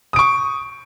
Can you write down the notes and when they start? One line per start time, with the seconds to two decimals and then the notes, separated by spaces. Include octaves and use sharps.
0.13 D#6
0.16 D7
0.19 C#6